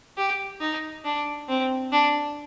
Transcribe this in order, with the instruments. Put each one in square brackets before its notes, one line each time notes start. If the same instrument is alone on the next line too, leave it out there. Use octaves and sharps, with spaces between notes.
[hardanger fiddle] G4
D#4
D4
C4
D4